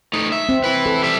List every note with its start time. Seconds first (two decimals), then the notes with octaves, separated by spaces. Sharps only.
0.13 A3 D#4
0.32 E5
0.49 C4
0.64 E4 B4
0.86 A4
1.03 G3 E5